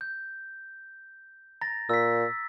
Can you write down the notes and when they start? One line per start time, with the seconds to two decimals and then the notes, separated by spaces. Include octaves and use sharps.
0.01 G6
1.61 A#5 A6 A#6
1.89 A#2 E6 B6